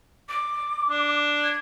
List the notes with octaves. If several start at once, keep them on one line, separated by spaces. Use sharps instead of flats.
D6
D4
G#6